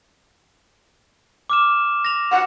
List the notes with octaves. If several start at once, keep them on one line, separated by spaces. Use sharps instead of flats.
D6 F6 E7
A#6 F7
F#5